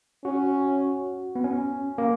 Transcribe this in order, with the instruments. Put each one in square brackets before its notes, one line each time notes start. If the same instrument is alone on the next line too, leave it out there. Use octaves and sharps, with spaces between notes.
[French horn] C#4 [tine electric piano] F#4
[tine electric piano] B3
C#4
A#3